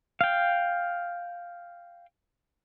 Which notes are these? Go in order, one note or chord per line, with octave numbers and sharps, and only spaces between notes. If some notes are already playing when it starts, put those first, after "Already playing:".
F5 G5